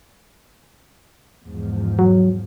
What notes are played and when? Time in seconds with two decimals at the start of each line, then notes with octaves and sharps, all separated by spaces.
1.46 E2 G#2 F3
1.99 F#3